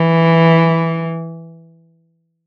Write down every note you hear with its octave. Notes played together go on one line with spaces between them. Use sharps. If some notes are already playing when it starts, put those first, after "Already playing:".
Already playing: E3